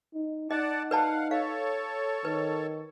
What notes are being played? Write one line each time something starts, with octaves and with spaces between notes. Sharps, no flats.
D#4
D#4 D5 D#5 F#5 A5
B4 D5 F5 F#5 A5
A4 C#5 F5
D#3 B4